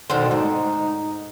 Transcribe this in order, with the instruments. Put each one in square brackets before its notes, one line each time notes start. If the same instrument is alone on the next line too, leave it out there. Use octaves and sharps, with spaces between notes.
[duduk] B2 [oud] D3 D#3 C5
[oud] G#2 [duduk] D#4